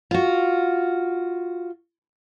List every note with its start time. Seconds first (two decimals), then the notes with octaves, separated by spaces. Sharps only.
0.11 F4 F#4